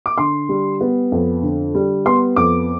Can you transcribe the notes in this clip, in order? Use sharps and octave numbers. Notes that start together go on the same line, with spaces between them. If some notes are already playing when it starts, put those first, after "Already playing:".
D6
D3 C6
G3
B3
F2
D3
G3
B3 C6
F2 D6